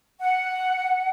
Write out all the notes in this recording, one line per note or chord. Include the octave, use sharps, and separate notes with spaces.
F#5